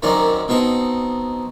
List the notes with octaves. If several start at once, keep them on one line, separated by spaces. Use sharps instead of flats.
F#2 D#3 C4 C#4 D#4 D5
B2 C4 D#4 A5